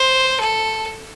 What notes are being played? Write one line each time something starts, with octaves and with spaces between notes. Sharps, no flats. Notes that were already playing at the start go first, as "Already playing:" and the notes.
Already playing: C5
A4